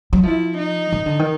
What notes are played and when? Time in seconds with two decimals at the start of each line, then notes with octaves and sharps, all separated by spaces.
0.13 F#3
0.23 F3 E4
0.58 D#4
0.93 D#3
1.06 D3
1.19 D#3